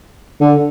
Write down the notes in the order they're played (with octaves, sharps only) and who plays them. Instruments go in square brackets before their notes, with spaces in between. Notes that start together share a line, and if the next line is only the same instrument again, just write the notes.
[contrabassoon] D3